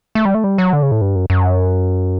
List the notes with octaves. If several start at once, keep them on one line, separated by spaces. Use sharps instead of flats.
A3
G3
A3
G3
F#3
D3
C#3
A2
G2
F#2
F#2